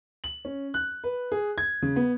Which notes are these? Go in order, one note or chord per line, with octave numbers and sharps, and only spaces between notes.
F#7
C#4
F#6
B4
G#4
G#6
C#3
B3